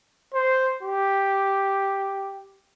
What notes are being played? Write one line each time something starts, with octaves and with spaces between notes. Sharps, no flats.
C5
G4